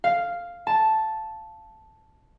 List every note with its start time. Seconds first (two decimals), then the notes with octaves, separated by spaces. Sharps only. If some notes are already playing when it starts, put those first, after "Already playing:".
0.04 F5
0.67 A5